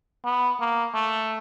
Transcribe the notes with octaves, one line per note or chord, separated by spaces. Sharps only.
B3
A#3
A3